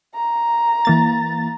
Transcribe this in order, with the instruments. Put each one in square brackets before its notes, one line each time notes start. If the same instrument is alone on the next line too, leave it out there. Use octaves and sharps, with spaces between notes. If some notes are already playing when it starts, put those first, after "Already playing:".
[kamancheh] A#5
[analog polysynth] E3 A#3 A6